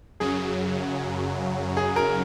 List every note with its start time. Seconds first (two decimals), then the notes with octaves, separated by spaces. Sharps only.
0.20 F#2 C#3 F#3 G#4
1.77 G#4
1.96 A#4